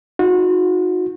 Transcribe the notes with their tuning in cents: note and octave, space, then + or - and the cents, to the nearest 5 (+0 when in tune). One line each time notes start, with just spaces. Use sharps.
D#4 +20 F#4 -30